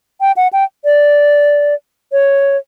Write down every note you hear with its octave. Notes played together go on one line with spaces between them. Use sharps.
G5
F#5
G5
D5
C#5